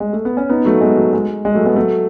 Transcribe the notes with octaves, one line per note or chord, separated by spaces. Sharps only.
G#3
A3
B3
C#4
B3 D#4
F#3 A3
G#3 B3
F#3
G#3
G#3
F#3 A3
G#3 B3
F#3 A3